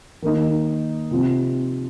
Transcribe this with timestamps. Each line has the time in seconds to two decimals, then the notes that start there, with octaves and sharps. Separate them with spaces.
0.22 D#3 A#3 D#4
1.11 C3 F3 C4